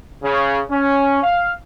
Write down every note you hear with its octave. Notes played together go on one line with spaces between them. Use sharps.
C#3
C#4
F5